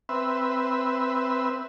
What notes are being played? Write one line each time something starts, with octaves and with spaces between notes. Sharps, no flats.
C4 B4 E5